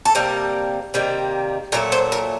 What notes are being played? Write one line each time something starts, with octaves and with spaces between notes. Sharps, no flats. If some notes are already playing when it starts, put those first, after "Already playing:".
A4
C3 G3 A#3 A#4
C3 D#3 G3 A#3
A#2 F#3 A3 A#4
C5
A#4